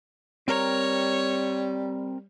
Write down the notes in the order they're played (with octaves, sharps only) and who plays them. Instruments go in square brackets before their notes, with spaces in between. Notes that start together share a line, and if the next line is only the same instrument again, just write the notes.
[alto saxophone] G3 [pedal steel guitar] C4 A#4 A#5 [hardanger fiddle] C#5